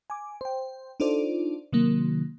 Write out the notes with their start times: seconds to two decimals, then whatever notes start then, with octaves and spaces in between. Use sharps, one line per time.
0.10 G#5 D6
0.41 C5 G5
1.00 D4 D#4 F4 A4 C5 D5
1.73 C3 D#3 F#3 A#3